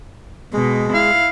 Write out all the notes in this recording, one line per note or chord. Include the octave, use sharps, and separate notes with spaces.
B2 G#3
E4 F5